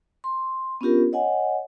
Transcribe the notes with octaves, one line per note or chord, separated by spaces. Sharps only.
C6
B3 C#4 D4 F4 G4 A#4
C#5 D#5 F#5 G#5